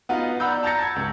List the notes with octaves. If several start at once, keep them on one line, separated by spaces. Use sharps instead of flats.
B3 D#4 F4 F#4
D5 F#5 A#5 B5 E6 G6
A5 A#5 G6 A6 A#6 C#7
A5 G#6
C#2